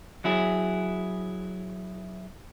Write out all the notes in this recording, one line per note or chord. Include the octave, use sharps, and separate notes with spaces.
F#3 E4 G#4